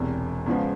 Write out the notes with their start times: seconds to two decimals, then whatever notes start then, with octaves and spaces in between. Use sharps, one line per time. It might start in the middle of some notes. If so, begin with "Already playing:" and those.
Already playing: E1 E2 C3
0.46 E2 C#3 F3 G#3 B3